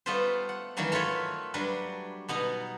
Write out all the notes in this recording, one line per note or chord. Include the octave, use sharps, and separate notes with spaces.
G3 A3 B3 F4 B4 C5
F#5
D#3 E3 F#3 G3 A#3
A3 F4 B4 C#5 B5
F#3 G3 D4 G4 B4
B2 B3 D#4 A#5